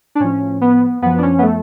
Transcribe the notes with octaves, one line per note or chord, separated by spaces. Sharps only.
D4
A2 F3 C#4
B3
F#2 F3 B3
D4
C#4
B3
A3